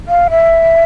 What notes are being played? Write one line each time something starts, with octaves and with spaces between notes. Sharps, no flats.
F5
E5